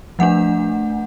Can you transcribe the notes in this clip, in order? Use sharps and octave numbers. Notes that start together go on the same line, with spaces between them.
F3 A3 D4 F#5